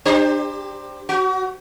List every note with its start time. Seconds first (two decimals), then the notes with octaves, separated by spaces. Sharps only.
0.05 D4 G4 C5
1.09 F#4